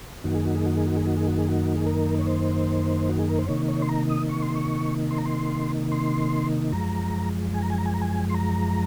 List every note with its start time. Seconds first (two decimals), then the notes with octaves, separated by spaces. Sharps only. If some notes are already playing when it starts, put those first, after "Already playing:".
0.24 F#2 D#3 A#3 D#4 F#4
0.35 G#4
0.45 F#4
0.55 G#4
0.66 F#4
0.76 G#4
0.86 F#4
0.97 G#4
1.06 F#4
1.17 G#4
1.28 F#4
1.38 G#4
1.48 F#4
1.75 G#4
1.86 A#4
2.19 C#5
2.27 C5
3.09 F#4
3.18 G#4
3.29 A#4
3.39 C5
3.48 C3 D#3 A#3 D#4 C#5
3.68 C#5
3.82 C6
3.89 A#5
4.09 D#6
4.29 C#6
4.43 C6
4.55 C#6
5.11 C6
5.18 A#5
5.26 C6
5.92 C6
6.72 F#2 F3 G#3 A#5
7.54 G#5
7.62 A#5
7.70 G#5
7.78 A#5
7.86 G#5
7.94 A#5
8.02 G#5
8.30 C6
8.34 A#5